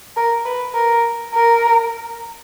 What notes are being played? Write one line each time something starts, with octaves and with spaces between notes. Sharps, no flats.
A#4
B4
A#4
A#4